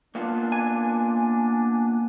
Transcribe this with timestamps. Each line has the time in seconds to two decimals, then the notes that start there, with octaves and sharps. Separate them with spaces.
0.15 A#3 B3 D4 F4
0.52 G#5